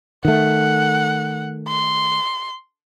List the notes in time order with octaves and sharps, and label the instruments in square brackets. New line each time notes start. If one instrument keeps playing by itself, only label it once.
[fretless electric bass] D#3 A3 [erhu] F#5
[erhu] C6